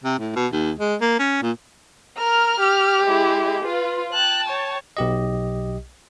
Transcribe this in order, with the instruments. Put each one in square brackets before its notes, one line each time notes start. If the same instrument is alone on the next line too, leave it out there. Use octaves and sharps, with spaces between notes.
[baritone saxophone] C3
A2
B2
D#2
G#3
A#3
C#4
A#2
[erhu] A#4 [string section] F6
[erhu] G4
[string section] G#3 E4
F4 B4
[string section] G5 A5 [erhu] F#6
[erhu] C#5
[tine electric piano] B1 G4 D#5